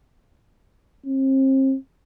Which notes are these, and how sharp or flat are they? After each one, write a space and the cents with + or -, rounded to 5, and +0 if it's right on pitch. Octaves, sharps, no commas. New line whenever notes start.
C4 +35